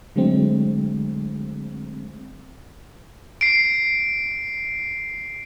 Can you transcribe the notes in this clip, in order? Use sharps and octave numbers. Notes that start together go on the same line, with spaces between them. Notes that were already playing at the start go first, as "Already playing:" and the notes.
D3 F#3 G#3 A3 C4
C7 D7